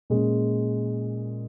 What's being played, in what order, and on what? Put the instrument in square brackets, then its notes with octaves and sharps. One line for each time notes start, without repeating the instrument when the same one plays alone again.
[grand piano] A#2 G#3 C#4